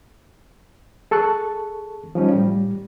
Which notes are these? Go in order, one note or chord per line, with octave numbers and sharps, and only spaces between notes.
G#4 A4 A5 C#6 F#6
F3 G3 C#4 D#4
A2 G3